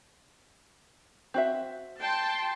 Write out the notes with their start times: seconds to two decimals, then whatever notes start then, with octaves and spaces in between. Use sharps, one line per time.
1.34 C4 F#4 E5
1.99 G5 A5 C6